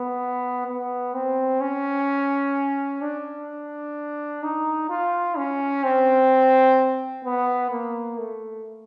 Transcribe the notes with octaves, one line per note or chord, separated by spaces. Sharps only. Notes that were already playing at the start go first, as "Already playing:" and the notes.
Already playing: B3
B3
C4
C#4
D4
D#4
F4
C#4
C4
B3
A#3
A3